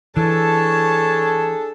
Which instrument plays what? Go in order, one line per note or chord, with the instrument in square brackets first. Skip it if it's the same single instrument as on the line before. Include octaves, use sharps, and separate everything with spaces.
[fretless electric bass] E3 [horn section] D4 G#4 A4 [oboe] C#5 [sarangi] A5